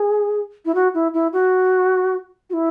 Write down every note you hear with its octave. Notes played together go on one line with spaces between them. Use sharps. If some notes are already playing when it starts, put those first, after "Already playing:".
Already playing: G#4
E4
F#4
E4
E4
F#4
F#4
E4